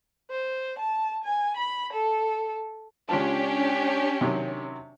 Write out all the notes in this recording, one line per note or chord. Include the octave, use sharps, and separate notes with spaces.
C5
A5
G#5
B5
A4
C#2 C#4 D4 F4 G4 A5
C3 D#3 F#3